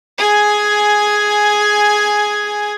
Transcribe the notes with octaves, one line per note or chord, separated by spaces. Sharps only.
G#4 G#5